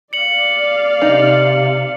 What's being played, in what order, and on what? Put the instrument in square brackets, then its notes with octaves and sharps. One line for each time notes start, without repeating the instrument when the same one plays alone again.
[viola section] D5 F5 [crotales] C#7 F#7
[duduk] C3 [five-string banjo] D#4